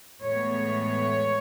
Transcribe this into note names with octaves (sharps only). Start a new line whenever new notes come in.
A2 E3 G#3 B3 C#5